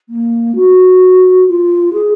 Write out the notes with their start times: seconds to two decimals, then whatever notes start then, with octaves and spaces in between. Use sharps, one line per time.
0.09 A#3
0.56 F#4
1.48 F4
1.93 G#4